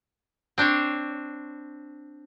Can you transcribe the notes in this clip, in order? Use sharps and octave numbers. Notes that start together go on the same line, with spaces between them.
C4 D4 C5 C#5